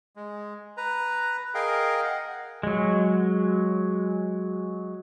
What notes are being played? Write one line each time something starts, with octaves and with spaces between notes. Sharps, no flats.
G#3
B4 A#5
G#4 A#4 D#5 F5 G5
D#5 F#5
F#3 G#3